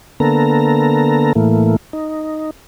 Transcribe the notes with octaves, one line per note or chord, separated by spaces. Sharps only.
D3 A#3 B3 A4 A#5
A2 E3 A3 A#3
D#4